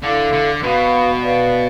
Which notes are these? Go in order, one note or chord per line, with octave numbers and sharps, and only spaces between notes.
D3 E4 A4 D5 F5
D3
B2 B4 F5 B5
B4 D5 F5